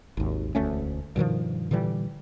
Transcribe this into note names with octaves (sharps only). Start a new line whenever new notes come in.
G#1 D#2
E1 D2 A3 C#4
G2 B2 D#3 F3
A#2 D3 E3 G3